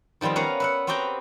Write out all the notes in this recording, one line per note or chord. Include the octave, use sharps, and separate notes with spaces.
D#3 F3 G3 B3 C4
B3 C#4 A#4 F5 F#5 A#5
B4 E5 F#5
B3 C4 F#4 G4 G5 A#5